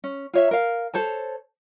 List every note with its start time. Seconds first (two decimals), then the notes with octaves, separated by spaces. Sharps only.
0.04 C#4
0.33 F4 C#5 E5
0.51 A#4 F5
0.93 A4 C5 C#5 A5